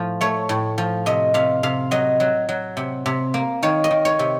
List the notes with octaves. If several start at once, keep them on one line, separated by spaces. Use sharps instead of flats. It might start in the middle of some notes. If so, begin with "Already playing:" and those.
Already playing: A2 F3 C5
A3 C#5
A2
F3
C3 D#5
C3 F5
C3 F5
F#3 D#5
F#3
F#3
C3
C3
A#3
D#3 C#5
D#5
D#3
C#5
C3